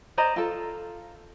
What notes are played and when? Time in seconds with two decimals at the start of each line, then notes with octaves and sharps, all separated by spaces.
0.18 C5 D5 D#5 A#5
0.36 F4 A4